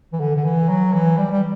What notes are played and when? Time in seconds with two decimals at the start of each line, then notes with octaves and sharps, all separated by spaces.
0.13 E3
0.20 D3
0.37 D3
0.45 E3
0.69 F#3
0.93 E3
1.18 G3
1.32 G3